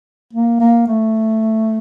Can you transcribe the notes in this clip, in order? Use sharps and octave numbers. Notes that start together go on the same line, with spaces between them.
A#3
A#3
A3